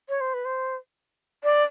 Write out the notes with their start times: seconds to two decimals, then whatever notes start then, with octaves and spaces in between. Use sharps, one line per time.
0.09 C#5
0.21 C5
0.34 B4
0.45 C5
1.44 D5